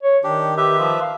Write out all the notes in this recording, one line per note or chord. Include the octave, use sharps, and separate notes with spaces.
C#5
D#3 D4 G4
G4 B4 E5
F3
F5